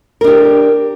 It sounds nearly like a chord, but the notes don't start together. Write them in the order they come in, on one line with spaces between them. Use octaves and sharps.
A#4 D4 G4